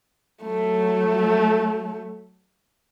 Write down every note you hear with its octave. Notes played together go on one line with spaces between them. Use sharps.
F#3 A3